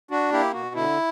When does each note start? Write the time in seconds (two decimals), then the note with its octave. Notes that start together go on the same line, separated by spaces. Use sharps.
0.11 D4 F#4
0.32 A#3 E4 G4
0.53 B2 F#4
0.75 D3 E4